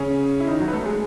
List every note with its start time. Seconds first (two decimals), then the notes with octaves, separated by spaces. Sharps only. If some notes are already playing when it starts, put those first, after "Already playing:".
Already playing: C#3 C#4
0.40 E4
0.47 D#3 D#4
0.60 F#3 F#4
0.68 B4
0.73 A3 A4
0.85 G#3 G#4